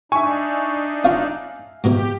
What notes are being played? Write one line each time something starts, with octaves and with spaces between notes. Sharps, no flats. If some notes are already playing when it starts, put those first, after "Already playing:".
D4 D#4 E5 G#5 C#6
C#4 F4 F5
G#2 B2 E3 G4